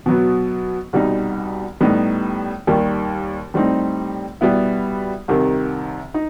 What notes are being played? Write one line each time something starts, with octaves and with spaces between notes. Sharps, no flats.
B2 F#3 B3
C2 B2 G3 D#4
A2 G3 B3 D#4
D#2 D#3 G3
A2 G3 C4 D#4
B2 G3 B3 E4
C2 C3 D#3
D#4